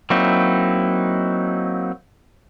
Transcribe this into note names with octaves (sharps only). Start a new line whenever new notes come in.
F#3 A#3 C4 D#4 E4